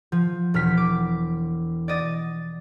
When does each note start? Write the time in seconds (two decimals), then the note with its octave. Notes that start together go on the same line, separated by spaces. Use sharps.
0.12 F3
0.54 E1 F6 B6
0.77 D6
1.88 D5 D#5 A6